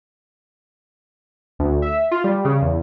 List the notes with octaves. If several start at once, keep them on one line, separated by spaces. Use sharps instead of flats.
D2
E5
F4
G3
C#3
E2